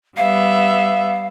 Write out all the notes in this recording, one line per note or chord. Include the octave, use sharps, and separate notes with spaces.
G3 B3 E5 F5